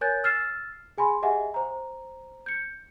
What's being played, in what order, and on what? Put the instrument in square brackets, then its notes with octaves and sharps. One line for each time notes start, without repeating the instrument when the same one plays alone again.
[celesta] A#4 C#5 G#5 F#6 G6 A6
E6 F6 A6 C7 E7
G#4 G#5 B5 C6
G4 G#4 D#5 E5 F#5 G#5
C5 A#5
G6 C#7